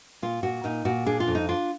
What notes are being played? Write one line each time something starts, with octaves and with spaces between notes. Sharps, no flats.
A#2 F4
A#2 F#4
A#2 D#4
A#2 F#4
D4 G#4
F4
F2
D#4
D4 F4